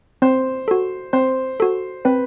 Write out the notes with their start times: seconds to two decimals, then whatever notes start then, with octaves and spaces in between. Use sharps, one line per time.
0.22 C4 C5
0.68 F#4 A4
1.13 C4 C5
1.60 F#4 A4
2.05 C4 B4